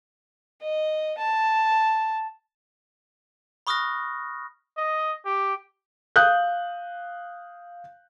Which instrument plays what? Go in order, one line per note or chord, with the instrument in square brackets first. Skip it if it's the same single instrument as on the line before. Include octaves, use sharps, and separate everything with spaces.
[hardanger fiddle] D#5
A5
[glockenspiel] B5 C#6 D#6 F6 F#6 A#6
[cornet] D#5
G4
[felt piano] F5 D#6 F#6 G6